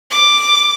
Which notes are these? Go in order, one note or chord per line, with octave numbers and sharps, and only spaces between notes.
D6